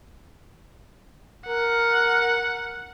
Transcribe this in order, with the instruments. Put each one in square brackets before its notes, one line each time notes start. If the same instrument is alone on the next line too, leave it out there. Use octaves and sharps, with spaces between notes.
[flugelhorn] A#4 [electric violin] F#5